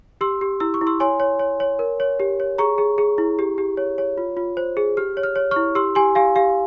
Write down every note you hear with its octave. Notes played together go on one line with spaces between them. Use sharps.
G4 C6 E6
G4
E4 E6
C#6
E4
C6 E6
C#5 G#5 C6
C#5
C#5
C#5
A#4
C#5
G4
C#5
G#4 A#5 C#6
G#4
G#4
E4
G4
G4
C#5
C#5
F4
F4
C5
G#4
G4 F6
C#5
F6
C#5
E4 C#6 F6
G4 C6 E6
G4 G#5 C6
G4 F5 G#5
G4 F5